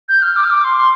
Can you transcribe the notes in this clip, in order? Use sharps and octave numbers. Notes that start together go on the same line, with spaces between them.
G6
F6
D6
F6
D6
C6